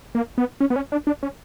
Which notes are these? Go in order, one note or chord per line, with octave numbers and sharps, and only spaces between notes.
A#3
B3
C#4
B3
C#4
D4
D4
C#4